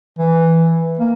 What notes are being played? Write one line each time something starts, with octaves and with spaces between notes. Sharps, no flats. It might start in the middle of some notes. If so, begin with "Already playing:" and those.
E3
A#3